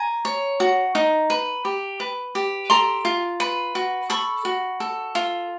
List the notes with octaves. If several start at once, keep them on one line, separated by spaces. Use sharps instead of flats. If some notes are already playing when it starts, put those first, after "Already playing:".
Already playing: G#5 A#5
C#5
F#4
D#4
B4
G4
B4
G4
A4 A#5 C6
F4
B4
F#4
A4 B5 C#6
F#4
A4
F4